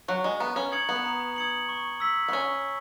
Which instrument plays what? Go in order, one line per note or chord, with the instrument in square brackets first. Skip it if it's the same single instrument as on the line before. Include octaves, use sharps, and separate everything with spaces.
[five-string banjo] F#3 [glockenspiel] C#6 F#6
[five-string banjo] G#3
[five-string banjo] B3 [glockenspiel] A#5
[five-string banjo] C#4
[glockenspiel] D#6 G#6 C#7 F#7
[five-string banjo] B3
[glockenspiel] A#5
D#6 G#6 C#7 F#7
C#6
E6 B6 F#7
[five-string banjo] B3
[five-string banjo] C#4 [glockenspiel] C#6